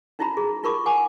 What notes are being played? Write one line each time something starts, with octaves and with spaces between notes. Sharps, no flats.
C#4 D#4 E4 F#4 A#5 B5
G#4
D#4 F4 A#4 B5 C#6 D6
A#4 F#5 G#5 D6